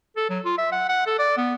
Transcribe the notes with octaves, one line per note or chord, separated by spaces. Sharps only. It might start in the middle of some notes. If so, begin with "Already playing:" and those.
A4
F#3
F4
E5
F#5
F#5
A4
D5
B3